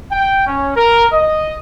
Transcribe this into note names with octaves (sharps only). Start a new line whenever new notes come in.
G5
C#4
A#4
D#5